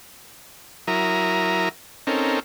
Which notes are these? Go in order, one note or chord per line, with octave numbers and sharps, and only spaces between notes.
F#3 E4 A#4 A#5 D#6
C4 C#4 D#4 A4 A#4